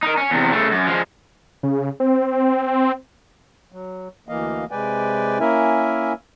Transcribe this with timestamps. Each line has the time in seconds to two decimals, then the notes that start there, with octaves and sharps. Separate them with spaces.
0.03 D#4 A#4
0.18 C#4
0.31 E2 C3
0.52 C#3 A3
0.71 F#2
0.87 F3 G#3
1.63 C#3
2.00 C4
3.72 F#3
4.28 D2 E3 A#3 D#5 F5
4.71 C3 G#3 B4 D5 G5 G#5
5.40 A#3 C#4 E4 A#4 E5 G#5